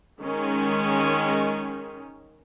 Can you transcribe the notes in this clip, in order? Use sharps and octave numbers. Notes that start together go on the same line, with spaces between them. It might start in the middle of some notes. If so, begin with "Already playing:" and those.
D#3 G#3 C#4